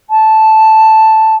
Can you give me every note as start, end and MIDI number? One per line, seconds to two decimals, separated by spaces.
0.10 1.36 81